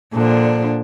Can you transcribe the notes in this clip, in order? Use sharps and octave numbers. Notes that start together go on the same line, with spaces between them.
A#2 D3 F3 D4